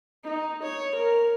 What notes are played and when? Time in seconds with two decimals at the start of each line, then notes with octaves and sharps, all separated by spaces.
0.24 D#4
0.62 C#5
0.95 A#4